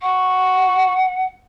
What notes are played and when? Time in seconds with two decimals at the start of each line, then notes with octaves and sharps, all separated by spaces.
0.01 F#5 C#6